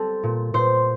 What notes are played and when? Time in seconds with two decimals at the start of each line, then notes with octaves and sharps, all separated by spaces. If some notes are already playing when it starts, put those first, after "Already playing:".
Already playing: G3 C4 A4
0.23 A#2
0.54 A#2 C5